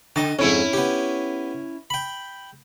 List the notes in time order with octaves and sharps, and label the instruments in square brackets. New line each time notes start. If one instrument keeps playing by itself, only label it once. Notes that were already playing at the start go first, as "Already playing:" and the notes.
[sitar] D3 [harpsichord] D#5 A5
[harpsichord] F2 G#2 [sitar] C#4 E4
[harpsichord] B3 G4
G5 B5